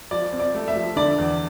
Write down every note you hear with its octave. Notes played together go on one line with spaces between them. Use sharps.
F3 D5
C4
D5
A3
E5
F3
D3 D5
E2